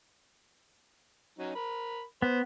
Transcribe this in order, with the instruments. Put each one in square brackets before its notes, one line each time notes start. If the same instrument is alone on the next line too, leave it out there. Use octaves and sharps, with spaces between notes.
[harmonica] F#3 C#4 D#4
A#4 B5
[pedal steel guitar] B3 [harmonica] C5